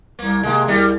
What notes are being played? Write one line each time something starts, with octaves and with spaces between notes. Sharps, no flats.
C2 A#3
C3 D#3 G#3 A#3
C2 G3